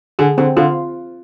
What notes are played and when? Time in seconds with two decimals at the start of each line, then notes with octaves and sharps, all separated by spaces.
0.19 D3 G#4
0.38 D3 C4
0.57 D3 F4